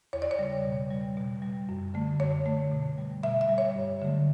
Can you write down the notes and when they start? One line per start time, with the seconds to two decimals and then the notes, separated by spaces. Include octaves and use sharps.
0.13 E2 C#5
0.22 D5
0.31 C#5
0.39 C#3 G3
0.65 B2
0.91 G3
1.17 B2
1.42 G3
1.69 F#2
1.94 D3 A3
2.20 F#2 C#5
2.46 D3 A3
2.71 B2
2.98 G3
3.23 B2 E5
3.41 E5
3.49 G3
3.58 C#5
3.76 G2
4.02 D3 F#3 A3